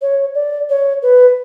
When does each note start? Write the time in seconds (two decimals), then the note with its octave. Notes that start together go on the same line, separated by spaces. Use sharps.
0.02 C#5
0.35 D5
0.69 C#5
1.02 B4